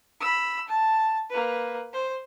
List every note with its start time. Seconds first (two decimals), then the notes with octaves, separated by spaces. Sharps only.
0.20 B5 E6
0.68 A5
1.30 A#3 B4
1.93 C5